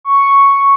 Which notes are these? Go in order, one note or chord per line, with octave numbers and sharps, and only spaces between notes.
C#6